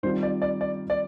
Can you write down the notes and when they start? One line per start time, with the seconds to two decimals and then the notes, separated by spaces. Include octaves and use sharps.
0.03 D#3 G3 C4 F4 C5
0.23 D5
0.42 D5
0.61 D5
0.90 D5